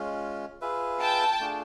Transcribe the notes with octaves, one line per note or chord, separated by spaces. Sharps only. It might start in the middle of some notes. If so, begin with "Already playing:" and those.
Already playing: G#3 C#4 F4
F4 G#4 B4 E5
G5 A5
A3 D4 F4 G#4